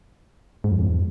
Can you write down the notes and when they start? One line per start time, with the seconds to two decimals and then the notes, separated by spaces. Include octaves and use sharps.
0.64 G#2
0.72 F2
0.80 E2